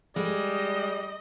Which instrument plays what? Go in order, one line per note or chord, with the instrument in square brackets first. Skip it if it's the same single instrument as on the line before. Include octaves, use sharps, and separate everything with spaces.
[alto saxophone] G3 [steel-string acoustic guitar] G#3 [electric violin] D#5